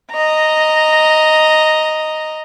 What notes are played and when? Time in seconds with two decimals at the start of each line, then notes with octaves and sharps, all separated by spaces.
0.12 D#5 A#5